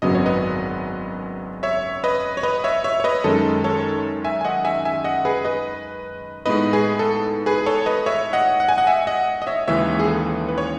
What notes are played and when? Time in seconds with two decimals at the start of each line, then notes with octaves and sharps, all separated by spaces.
0.02 G#1 F#2 C#3 F#3 B3 D#5
0.15 C#5
0.26 B4 D#5
1.63 C#5 E5
2.04 B4 D#5
2.37 C#5
2.43 B4 D#5
2.64 C#5 E5
2.84 C#5 E5
3.00 C#5
3.04 B4 D#5
3.24 F#2 D#3 G#3 C#4 A4
3.64 A4 C#5
4.24 E5 G#5
4.41 G#5
4.45 D#5 F#5
4.65 E5 G#5
4.85 E5 G#5
5.04 D#5 F#5
5.25 G#4 B4
5.45 B4 D#5
6.46 A2 G#3 B3 D#4 B4 D#5
6.73 G#4 B4
6.99 A4
7.46 G#4 B4
7.66 A4 C#5
7.86 B4 D#5
8.06 C#5 E5
8.33 D#5 F#5
8.60 F#5
8.69 G#5
8.78 D#5 F#5
8.87 E5 G#5
9.07 D#5 F#5
9.42 D#5
9.47 C#5 E5
9.67 D#2 C#3 E3 G#3 C#4 C#5 E5
9.99 G#4
10.07 A4
10.49 B4
10.58 C#5